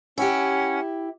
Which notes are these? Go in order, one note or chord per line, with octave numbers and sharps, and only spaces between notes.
C#4 E4 G4 F#5